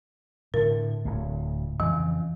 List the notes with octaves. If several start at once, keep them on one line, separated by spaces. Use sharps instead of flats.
A2 D3 A#4
D1 D2
F2 C#3 E3